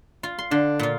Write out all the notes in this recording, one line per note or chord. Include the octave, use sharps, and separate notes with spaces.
F4
C6
D3 D4
A#2 F4